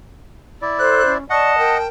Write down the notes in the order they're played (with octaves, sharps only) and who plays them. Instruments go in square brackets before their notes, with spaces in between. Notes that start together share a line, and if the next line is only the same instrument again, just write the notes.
[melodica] E4 D5
[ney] A4 [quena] C5 [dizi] F#6
[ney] C#4
[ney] D5 [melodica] D#5 F#5 [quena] A5 [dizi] C#6
[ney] A#4 [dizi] G5